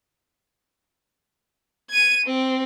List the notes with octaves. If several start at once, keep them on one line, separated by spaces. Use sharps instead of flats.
G#6 D#7
C4